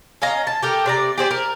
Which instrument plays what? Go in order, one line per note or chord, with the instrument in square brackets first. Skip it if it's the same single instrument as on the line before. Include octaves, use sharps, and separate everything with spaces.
[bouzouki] C#4 D#5 F5 A#5
A5
G4 A4 A#4
C3 D5 A#5
G4 G#4 C5 D5
A#4